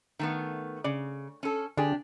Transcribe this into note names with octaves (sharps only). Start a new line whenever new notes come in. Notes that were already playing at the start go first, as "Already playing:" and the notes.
D#3 A3 B3
C#3 D5
C#4 A4
D3 D4 G4 G#4 G#5